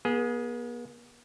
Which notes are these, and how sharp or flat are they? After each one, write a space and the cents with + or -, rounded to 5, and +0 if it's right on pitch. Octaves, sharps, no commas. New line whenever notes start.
B3 -45 G#4 +0